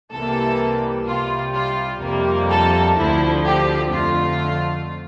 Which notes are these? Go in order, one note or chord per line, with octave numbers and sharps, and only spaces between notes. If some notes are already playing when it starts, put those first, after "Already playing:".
C2 C3 E3 G3 A#3 A4
C2 C3 G3 F4
F4
F2 C3 G3 A#3
A4
D2 D3 F3 E4
G4
F2 D3 A3 F4